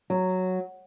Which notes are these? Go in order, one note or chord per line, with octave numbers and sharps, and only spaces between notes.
F#3